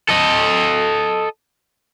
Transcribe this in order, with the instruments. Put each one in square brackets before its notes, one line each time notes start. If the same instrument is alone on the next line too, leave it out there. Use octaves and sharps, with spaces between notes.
[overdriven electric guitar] A4 D#5